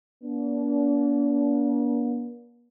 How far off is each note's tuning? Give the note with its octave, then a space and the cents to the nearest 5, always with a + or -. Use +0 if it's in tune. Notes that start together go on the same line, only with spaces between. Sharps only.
A#3 +45 D4 -40